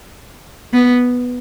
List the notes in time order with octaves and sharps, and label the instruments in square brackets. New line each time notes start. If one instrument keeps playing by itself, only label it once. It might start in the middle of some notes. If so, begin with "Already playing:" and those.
[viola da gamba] B3